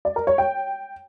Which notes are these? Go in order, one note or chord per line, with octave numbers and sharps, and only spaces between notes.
D5
A#4
C#5
G5